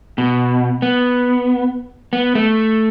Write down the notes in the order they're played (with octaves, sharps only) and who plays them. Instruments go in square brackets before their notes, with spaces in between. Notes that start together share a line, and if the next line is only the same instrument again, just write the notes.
[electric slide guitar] B2
B3
B3
A3